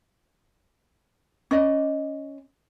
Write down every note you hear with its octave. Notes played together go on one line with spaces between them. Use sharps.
C#4 D5 D#5